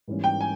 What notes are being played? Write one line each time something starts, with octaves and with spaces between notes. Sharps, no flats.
G#2 E3 G3 A#3 C#4
G5
G#5